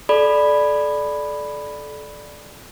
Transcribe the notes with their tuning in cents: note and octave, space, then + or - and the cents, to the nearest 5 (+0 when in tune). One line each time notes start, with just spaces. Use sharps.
A4 -30 D5 +5 B5 +0